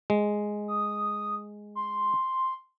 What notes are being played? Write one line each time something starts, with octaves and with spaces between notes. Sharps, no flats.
G#3
D#6
C6